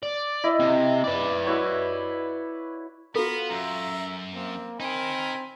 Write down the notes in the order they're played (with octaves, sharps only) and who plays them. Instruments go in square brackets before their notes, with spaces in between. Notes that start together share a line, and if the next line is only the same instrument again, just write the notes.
[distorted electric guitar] D5
[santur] E4 D#5
[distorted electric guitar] C3
B4 D5
[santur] E4 F#4 C#5
[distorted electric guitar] B3 [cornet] F4 [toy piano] F#4 A4 [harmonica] F5 A#5 B5
[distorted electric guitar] F#2 [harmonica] E5 A#5
[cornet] A#3 [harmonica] C4
[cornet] C4 [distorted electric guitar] D#4 A#4 [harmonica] G#5 B5